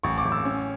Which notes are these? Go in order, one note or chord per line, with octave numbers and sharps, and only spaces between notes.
A1 C#6
D6
A1
E6
C#4